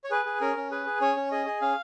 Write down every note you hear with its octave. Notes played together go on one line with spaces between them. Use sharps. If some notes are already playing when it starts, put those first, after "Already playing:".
C#5
G#4 B4
G#4
C#4 A#4
C#4
G#4 B4
G#4
C#4 C#5
C#4
G#4 D#5
G#4
C#4 F5